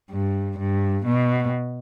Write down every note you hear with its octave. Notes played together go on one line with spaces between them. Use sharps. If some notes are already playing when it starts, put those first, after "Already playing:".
G2
G2
B2